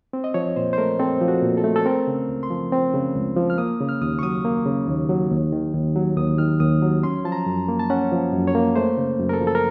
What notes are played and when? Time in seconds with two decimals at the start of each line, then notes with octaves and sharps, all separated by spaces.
0.13 C4
0.24 D#5
0.34 F3 C#5
0.56 A#2 C5
0.73 C5
0.78 A3 A#4
0.99 C4 A4
1.21 F3
1.28 F#4
1.42 A#2
1.57 A4
1.64 A3
1.76 A4
1.86 C4 A#4
2.07 C#3
2.29 C#2
2.43 C6
2.50 F3
2.72 C4
2.94 C#3
3.15 C#2
3.37 F3
3.50 F6
3.58 A#3 D#6
3.80 C#3
3.89 F6
4.02 D#2 D#6
4.19 C#6
4.23 F#3 D#6
4.45 A#3
4.66 C#3
4.87 D#2
5.09 F#3
5.31 D#2
5.52 D#3
5.74 D#2
5.96 F#3
6.17 D#2 D#6
6.38 D#3 F6
6.60 D#2 D#6
6.82 F#3
7.03 C#4 C6
7.25 F3 A5
7.32 A#5
7.46 F#2
7.68 A#3
7.79 A5
7.90 C#4 F#5
8.12 F3
8.33 F#2
8.47 C#5
8.55 A#3
8.76 A3 C5
8.98 C#3
9.19 F#2
9.29 A#4
9.33 A4
9.41 F3
9.47 A4
9.55 A#4